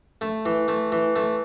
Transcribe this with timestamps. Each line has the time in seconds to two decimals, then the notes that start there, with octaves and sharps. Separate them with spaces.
0.21 A3
0.46 E3
0.68 A3
0.92 E3
1.16 A3